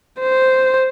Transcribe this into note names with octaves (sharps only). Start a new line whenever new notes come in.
C5